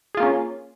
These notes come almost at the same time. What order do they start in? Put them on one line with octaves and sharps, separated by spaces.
G#4 F4 A#3 C#4